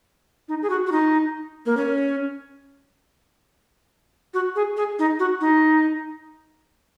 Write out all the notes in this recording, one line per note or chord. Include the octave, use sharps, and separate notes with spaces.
D#4
G#4
F#4
F#4
D#4
A#3
C#4
F#4
G#4
G#4
D#4
F#4
D#4